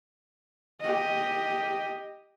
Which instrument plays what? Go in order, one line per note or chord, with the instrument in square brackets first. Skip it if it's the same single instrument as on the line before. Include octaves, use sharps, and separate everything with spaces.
[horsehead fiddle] G4 D#5